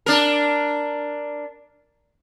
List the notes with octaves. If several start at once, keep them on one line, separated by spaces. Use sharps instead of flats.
D4 A#4